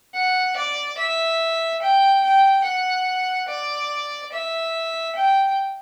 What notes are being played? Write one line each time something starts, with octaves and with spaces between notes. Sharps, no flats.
F#5
D5
E5
G5
G5
F#5
D5
E5
G5